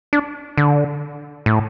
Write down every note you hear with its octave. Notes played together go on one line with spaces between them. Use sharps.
D4
D3
A2